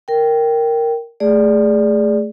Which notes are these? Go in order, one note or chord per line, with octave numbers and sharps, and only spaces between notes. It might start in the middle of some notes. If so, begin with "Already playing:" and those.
A#4 G5
A3 G#4 D5